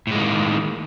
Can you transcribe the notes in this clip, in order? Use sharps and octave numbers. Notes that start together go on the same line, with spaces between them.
A2 D#3 G#3 A#3